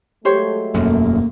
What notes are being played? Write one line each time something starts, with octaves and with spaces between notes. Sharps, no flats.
F#3 G#3 A3 G4 C5 C#5
E1 F#2 A#3